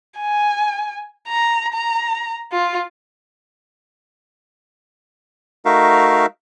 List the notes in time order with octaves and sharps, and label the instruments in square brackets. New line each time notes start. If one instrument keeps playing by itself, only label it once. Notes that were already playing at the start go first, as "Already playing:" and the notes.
[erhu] G#5
A#5
A#5
F4
[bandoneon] A3 D#4 F#4 A#4 E5 F5